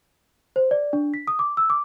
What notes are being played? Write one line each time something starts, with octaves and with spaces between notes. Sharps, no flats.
C5
D5
D4
B6
D#6
D6
E6
D6